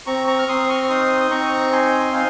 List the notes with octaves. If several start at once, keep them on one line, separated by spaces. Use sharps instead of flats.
C4 A#5 C#6
A#5 C#6
F6
C4 C6 D#6
C#6 F6
C#6
D#4 C6 D#6
D#6
C4 A#5 C#6
D#4 G#5 C6
D#4 F5 G#5